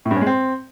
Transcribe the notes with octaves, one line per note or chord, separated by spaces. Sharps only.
A2
G2
C#4
G#3
C4